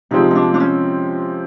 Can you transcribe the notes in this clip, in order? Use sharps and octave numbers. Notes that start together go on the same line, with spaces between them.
C3 F3 G#3 C4 D#4
D#4
D4
D4
C#4